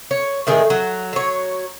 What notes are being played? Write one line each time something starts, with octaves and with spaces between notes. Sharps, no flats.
C#5
A2 D#3 G#3 G#4
F#3
F#3 C#5